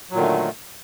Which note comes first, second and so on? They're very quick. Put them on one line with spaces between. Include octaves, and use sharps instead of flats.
F#3 A#2 D#3 D3 A3